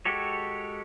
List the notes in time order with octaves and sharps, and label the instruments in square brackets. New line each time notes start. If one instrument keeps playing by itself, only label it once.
[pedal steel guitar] G#3 F#4 G4 A4 C#5